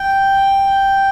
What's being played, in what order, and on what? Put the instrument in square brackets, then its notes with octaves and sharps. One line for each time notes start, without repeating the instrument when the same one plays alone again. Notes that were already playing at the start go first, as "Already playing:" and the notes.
Already playing: [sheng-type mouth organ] G5